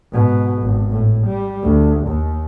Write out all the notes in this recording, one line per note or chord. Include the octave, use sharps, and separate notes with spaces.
G#2 B2
G#1
A2
G3
D2
D#2